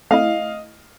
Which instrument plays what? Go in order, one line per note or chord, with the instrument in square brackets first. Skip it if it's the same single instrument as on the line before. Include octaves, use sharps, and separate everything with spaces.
[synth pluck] A3 C4 E4 [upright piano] D#5 F5